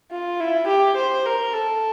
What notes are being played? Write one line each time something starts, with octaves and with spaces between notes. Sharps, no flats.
F4
E4
G4
C5
A#4
A4